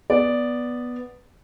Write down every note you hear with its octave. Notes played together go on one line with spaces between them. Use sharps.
B3 D5